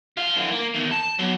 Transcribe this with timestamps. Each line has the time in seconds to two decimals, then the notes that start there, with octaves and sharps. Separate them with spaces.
0.17 F3 F5
0.36 D3 E3
0.51 A#3
0.74 E2 D#3
0.91 A5
1.19 F#3 B3